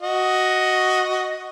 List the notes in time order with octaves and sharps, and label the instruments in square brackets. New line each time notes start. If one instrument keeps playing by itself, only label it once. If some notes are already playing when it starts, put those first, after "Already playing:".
[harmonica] F#4 D#5